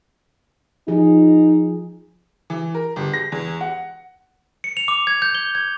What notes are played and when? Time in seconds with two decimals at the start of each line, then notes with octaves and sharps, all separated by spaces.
0.88 F3 D#4 G#4
2.50 E3
2.74 A#4
2.96 G1
3.14 A#6
3.32 E2
3.61 F#5
4.64 C#7
4.77 F7
4.88 D6
5.07 G#6
5.22 G6
5.35 G7
5.55 G#6